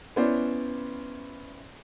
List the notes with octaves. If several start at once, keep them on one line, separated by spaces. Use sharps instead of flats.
B3 C#4 E4 C5 D5